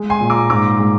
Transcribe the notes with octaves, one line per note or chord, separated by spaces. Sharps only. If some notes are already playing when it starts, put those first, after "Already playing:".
Already playing: G#3
G#5 C6
A#2
A#5 D6
G#2 A#5 D6
G#3